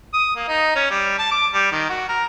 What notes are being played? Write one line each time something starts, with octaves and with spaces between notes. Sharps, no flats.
D#6
A#3
D#4
C#4
G3
A5
D6
G3
D#3
F#4
A#4